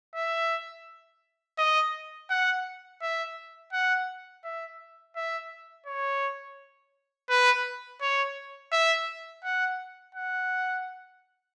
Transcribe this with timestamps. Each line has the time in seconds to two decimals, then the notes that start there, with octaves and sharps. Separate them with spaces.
0.15 E5
1.58 D#5
2.30 F#5
3.02 E5
3.73 F#5
4.44 E5
5.16 E5
5.86 C#5
7.30 B4
8.01 C#5
8.72 E5
9.44 F#5
10.15 F#5